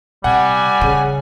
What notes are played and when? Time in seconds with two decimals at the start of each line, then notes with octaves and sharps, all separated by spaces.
0.24 C3 G3 F#5 G#5
0.81 C#3